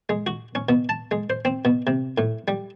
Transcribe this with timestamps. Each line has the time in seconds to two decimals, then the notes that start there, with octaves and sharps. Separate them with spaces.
0.09 G#3
0.27 F#4
0.55 C#4
0.69 B2
0.89 A5
1.11 G#3
1.30 C5
1.45 C4
1.65 B2
1.87 C3
2.18 A2
2.48 G3